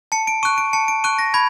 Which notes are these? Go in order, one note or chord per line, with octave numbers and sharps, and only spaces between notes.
A5 C#7
D7
C#6 F#6 D#7
D7
A5 C#7
D7
C#6 F#6 D#7
A#6
B5 G#6